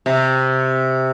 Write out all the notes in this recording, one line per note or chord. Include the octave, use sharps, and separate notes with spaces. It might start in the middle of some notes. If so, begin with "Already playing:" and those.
C3